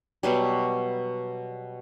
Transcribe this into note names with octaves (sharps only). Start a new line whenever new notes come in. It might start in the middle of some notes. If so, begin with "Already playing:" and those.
B2 F#3 G3